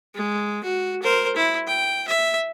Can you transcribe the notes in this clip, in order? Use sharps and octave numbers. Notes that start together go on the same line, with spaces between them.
G#3
F#4
A#4 C5
E4
G5
E5